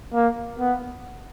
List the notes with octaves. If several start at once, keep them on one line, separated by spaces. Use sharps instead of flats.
A#3
B3